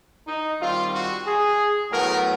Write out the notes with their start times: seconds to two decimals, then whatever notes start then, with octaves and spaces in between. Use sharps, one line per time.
0.27 D#4
0.59 D#3 G3 C4 F4
0.93 F#4
1.26 G#4
1.92 A2 F#3 B3 A#4